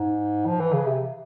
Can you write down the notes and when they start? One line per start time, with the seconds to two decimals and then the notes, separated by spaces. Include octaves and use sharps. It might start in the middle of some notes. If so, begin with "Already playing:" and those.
Already playing: G#2
0.47 F3
0.60 E3
0.73 C#3
0.86 C3